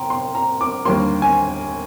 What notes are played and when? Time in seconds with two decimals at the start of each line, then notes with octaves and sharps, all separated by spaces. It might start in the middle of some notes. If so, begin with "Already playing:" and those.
Already playing: C3 G5 A#5 C6
0.10 C6
0.35 A#5
0.61 D6
0.85 D#2 D3 G3 A#3 C6
1.22 G#5